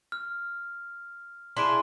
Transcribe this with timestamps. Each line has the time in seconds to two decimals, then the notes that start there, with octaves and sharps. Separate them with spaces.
0.12 F6
1.57 D4 E4 G#4 C6 D7